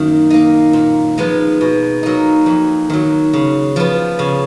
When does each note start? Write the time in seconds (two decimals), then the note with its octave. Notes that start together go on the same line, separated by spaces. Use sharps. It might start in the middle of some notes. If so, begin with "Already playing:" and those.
Already playing: F#2 D#3 A#3
0.30 A#3 D#4
0.73 A#2
1.18 F3 G#3 B3 D#4
1.61 B2
2.03 F#3 A#3 D#4
2.46 F2
2.90 D#3 F#3
3.33 C#3
3.76 F3 B3
4.19 C#3